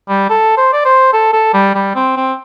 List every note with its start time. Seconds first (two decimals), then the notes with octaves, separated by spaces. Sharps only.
0.09 G3
0.30 A4
0.57 C5
0.73 D5
0.85 C5
1.13 A4
1.33 A4
1.54 G3
1.75 G3
1.95 C4
2.17 C4